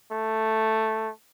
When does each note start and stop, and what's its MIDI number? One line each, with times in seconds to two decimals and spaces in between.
0.12 1.10 57